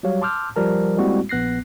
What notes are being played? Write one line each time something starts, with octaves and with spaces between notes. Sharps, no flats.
F#3 G3 F#4 G4 C#5 F5
A5 C6 D6 E6 F6 G6
F3 G3 A#4 A5
G3 G#3 A#3 C4 E4 F#4
A#1 B3 F#6 A#6 C7